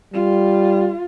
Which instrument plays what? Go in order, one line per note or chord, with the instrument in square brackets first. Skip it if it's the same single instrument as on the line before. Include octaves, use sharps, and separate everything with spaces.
[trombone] G3 [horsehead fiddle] F4